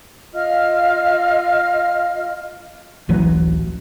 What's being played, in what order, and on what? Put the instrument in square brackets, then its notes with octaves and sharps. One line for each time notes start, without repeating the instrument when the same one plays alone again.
[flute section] F4 D#5 F5 F6
[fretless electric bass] D1 A1 E3 F#3